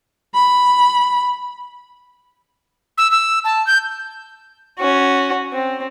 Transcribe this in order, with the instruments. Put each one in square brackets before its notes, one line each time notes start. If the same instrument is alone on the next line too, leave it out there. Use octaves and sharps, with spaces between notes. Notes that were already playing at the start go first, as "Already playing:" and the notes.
[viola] B5
[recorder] E6
E6
A5
G6
[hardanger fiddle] C#4 F#4
C4